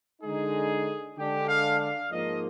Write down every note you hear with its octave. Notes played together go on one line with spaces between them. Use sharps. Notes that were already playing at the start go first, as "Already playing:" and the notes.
D3 G#3 D#4 G#4
D3 G#3 D4 G4
F5
F5
G#2 F3 A#3 D#5